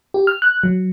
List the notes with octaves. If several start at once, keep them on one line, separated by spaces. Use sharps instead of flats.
G4
F6
F#6
F#3